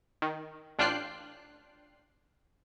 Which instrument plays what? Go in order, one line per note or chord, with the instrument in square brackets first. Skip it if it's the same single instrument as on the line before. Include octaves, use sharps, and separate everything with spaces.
[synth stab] D#3
A1 D4 F4 G5 F#6 C7